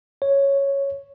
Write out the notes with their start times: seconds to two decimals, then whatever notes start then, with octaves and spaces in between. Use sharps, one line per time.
0.22 C#5